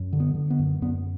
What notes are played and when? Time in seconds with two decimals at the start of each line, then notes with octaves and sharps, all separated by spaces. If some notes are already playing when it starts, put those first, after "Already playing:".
Already playing: F#2
0.13 D3
0.20 B3
0.35 D3
0.50 B3
0.59 F#2
0.82 F#2 B3